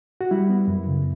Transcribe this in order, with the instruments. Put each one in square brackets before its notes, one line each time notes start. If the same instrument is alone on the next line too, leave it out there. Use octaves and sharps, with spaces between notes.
[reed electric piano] F#4
G3 E4
B3
F#2
C#3